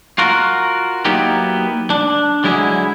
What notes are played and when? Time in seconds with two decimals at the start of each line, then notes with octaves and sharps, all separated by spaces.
0.18 F4 F#4 A#4
1.05 F#3 A#3 B3 D#4 E4 G4
1.90 D4
2.44 D3 F#3 G#3 E4 G#4